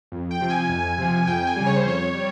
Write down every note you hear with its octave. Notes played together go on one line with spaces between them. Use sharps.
F2
G5
C3 F3
G#5
F2
C3 F3
F2 G5
G#5
C#3 G3
C#5
C5
F2 C#5
G3